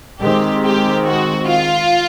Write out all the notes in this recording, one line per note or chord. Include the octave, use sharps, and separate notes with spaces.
D#3 G#3 C4 G4
G4
F#4
F4